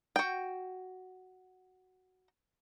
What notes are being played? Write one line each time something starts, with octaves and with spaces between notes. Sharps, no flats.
F#4 G5